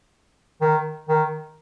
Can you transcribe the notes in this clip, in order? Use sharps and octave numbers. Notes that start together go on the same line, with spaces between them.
D#3
D#3